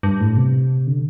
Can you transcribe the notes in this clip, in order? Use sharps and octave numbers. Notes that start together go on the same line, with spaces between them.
G2
A2
C3
D3